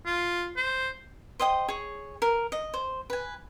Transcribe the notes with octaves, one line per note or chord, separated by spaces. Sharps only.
F4
C5
C5 D#5 G5 D#6
G#4 C#5
A#4
D#5
C5
B4 G#5